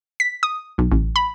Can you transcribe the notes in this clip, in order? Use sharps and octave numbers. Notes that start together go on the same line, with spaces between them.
B6
D#6
B1
A1
B5